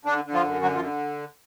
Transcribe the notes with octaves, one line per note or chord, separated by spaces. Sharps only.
D3 D4
D3
F3 F4
F#2
D3 F#3 F#4
F3 F4
D3